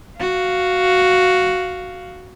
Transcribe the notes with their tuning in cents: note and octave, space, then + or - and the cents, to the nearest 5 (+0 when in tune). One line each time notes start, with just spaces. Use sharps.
F#4 +0 F5 +0